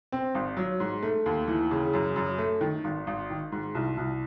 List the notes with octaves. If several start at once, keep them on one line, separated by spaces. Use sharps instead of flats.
C4
G#1
F#3
G#2
A3
D#2
E3
C#3
F#2
F#2
A3
D#3
G#1
G#1
D#3
G#2
C2
C2